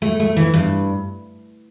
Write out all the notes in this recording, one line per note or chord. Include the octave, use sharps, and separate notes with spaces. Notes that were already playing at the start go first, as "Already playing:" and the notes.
A3
A3
E3
G2